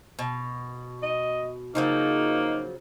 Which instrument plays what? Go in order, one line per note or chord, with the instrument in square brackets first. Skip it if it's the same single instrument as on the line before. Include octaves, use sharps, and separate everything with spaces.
[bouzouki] B2
[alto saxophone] D#5
[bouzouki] C#3 F3 F#3 [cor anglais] A#3 [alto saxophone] D#4